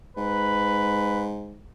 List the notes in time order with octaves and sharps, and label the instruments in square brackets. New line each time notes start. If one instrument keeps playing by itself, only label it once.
[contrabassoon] G#2 [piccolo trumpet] B4